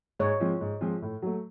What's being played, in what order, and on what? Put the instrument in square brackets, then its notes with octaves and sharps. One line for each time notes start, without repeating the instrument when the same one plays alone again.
[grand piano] G#2 [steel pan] C#5
[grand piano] F3 G#3 C4 F4
G#2
F3 G#3 C4 F4
A2
F#3 A3